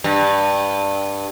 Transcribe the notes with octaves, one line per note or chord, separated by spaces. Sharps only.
G2